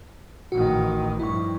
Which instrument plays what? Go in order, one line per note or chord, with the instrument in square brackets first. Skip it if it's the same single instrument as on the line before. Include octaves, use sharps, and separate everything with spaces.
[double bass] A1 D#3 [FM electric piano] F#4
[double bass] G2 F3 [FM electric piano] E4 C#6